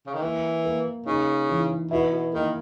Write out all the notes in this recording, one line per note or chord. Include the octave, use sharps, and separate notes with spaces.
C#3
D#3
E3 A#3
A#3
C#3 D#4
E3
B2 E4
B2
D#3 A#3